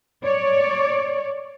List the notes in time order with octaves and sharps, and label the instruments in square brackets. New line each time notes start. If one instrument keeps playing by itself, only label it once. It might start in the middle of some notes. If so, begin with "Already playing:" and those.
[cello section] C#5 D5